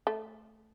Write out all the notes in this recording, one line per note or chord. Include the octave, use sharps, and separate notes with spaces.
A3